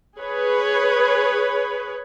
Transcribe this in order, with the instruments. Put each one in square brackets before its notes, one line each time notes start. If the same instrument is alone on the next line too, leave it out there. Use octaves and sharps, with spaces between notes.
[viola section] G#4 B4 C#5